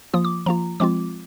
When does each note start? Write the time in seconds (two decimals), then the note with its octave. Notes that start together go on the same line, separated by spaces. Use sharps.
0.13 F3 A#3 F4 D#6
0.25 D6
0.46 F3 A#3 F4 A#5
0.80 F3 G#3 C4 F4 D6